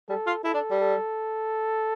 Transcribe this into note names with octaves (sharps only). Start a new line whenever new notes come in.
G3 A4
F4
E4 A4
D4
G3
A4